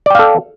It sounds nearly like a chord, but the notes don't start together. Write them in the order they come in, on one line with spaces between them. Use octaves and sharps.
D5 G5 F5 A4